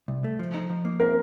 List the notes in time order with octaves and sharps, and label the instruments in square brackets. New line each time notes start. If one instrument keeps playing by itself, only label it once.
[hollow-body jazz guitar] C2
A3
F3
D#4
F3
A#3
[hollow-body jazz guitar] C4 [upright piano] A#4